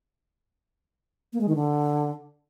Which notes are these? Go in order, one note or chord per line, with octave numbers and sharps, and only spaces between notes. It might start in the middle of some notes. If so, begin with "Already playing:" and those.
A#3
G#3
D#3
D3